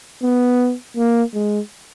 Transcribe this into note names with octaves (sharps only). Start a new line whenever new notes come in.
B3
A#3
G#3